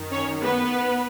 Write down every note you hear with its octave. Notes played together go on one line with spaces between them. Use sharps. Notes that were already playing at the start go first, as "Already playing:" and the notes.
Already playing: F#2 D#3
C#4 C#5
B3 B4